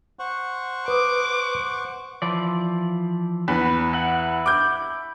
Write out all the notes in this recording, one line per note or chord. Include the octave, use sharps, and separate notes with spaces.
C5 F#5 C#6
B4 D6 D#6
E3 F3 D5
E2 B4
E4 F#5
D6 G6